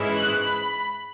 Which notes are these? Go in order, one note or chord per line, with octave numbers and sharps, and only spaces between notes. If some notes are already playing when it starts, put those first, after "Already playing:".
Already playing: G#2 E3 G#3 C#4 E4
F#6
B5